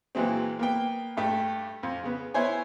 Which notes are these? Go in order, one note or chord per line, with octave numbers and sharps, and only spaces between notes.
A#2 E3 F#3 G#3 C4
A#3 B3 G5
G2 A3 G4
F2
C#3 B3
B3 E4 C5 C#5 G#5